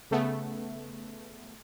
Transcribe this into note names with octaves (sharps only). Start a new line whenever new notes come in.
C#3 A3 B3